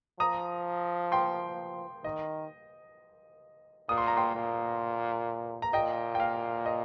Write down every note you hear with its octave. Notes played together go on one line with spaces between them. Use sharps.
F3 A#5 D#6
G5 C6
D#3 D#5
A#2 D#6
C6
A#5
G5 C6
A#2
A#5
A#2 D#5 G5
G5
F5
D#5